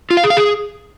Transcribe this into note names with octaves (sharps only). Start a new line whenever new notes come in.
F4
F5
G#4
F5
G#4